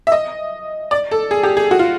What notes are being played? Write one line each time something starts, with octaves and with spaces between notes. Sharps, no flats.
E5
D#5
D5
A4
G#4
G4
G#4
F#4
F4